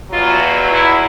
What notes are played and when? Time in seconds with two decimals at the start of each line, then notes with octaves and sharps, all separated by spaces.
0.11 E2 B2 F#3 F4
0.71 E4